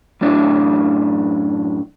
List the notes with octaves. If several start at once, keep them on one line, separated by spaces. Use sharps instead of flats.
F#2 A2 D4 E4